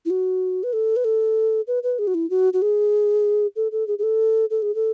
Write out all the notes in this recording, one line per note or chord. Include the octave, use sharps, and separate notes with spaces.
E4
F#4
B4
A4
B4
A4
B4
B4
G#4
F#4
E4
F#4
F#4
G#4
A4
A4
G#4
G#4
A4
A4
G#4
A4